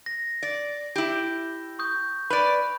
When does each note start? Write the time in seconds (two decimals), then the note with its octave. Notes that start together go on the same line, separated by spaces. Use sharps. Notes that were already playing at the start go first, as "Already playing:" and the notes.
0.06 A#6
0.43 D5
0.96 E4 G4
1.79 C#6 D#6 G6
2.30 B4 D5 B5